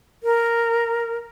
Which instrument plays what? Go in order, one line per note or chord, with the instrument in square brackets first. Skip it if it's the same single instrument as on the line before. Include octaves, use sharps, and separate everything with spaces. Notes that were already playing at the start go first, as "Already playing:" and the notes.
[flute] A#4